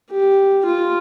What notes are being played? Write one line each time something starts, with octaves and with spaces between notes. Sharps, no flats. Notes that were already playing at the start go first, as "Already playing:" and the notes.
G4
F4